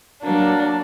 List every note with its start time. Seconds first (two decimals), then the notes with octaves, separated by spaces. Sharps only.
0.23 F#3 A#3 D4